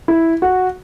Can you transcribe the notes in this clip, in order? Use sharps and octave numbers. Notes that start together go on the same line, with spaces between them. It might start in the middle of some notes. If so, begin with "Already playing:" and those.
E4
F#4